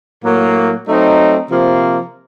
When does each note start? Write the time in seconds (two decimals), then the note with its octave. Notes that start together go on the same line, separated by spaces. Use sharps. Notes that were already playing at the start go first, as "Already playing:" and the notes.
0.23 A2 F#3 A#3
0.86 F#3 A3 C4 D#4
1.49 C3 F3 A#3